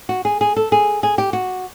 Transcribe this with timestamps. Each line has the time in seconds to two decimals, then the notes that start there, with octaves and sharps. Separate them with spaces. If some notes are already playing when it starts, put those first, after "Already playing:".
0.09 F#4
0.25 G#4
0.41 G#4
0.56 A4
0.72 G#4
1.03 G#4
1.18 G4
1.33 F#4